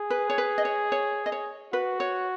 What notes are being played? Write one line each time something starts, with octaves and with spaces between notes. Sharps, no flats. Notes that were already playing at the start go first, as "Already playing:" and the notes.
Already playing: G#4
B4
C#5
B4
D#5
C#5
C#5
D#5
C#5
F#4 B4
C#5